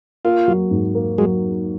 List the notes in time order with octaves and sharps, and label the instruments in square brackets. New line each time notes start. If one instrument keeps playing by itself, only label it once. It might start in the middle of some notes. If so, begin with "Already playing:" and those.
[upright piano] A#3 [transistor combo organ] F4
[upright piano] F#3
G#2
A#3
[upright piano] F#3 [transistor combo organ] G#3